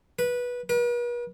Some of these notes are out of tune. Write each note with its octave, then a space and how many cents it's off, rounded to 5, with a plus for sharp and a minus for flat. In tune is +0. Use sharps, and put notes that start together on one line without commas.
B4 -15
B4 -45